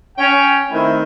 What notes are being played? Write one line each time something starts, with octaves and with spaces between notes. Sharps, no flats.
C#4 G5
D#3 A3 C4 D#4 E4